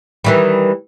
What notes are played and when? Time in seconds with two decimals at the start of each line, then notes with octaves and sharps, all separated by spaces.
0.24 D#3 E3 G3